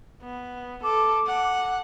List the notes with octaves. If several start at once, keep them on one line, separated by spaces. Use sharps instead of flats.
B3
A4 D6
F#5